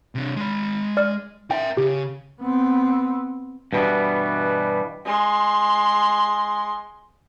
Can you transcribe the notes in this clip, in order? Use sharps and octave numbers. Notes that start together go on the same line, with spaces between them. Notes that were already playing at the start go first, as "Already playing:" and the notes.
C3 D4
G#3 B5
D5 F6
A#4 E5 G5
C#3 G4
B3 C4
G2 B2 E3 G3 B3
G#3 C6